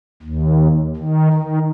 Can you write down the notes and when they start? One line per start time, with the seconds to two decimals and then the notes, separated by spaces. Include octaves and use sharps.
0.22 D#2
0.96 D#3
1.33 D#3